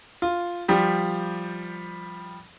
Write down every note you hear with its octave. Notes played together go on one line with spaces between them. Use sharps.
F4
F3 G3 G4